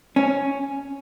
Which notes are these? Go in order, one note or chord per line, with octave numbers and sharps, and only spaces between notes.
C#4